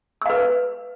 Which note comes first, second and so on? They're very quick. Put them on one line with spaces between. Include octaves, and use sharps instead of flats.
E6 F5 B4